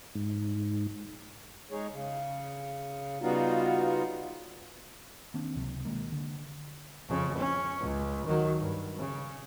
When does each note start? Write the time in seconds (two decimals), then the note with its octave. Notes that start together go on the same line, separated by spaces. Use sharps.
0.15 G#2
1.71 G#3 D#4 G#4 C#5
1.92 C#3
3.22 C#3 G3 B3 D#4 F4 F#4
5.34 D#3 A#3 C4 D4
5.56 C#2 C3 F#3
5.85 B2 D#3 G#3 A#3
6.12 D3
7.08 F2 C#3
7.38 C#4
7.80 C#2
8.27 D#3 F#3
8.59 G2
8.98 C#3